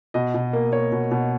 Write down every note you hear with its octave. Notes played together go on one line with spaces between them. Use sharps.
B2 D#5
B2
A#3
A#3 C#5
B2
B2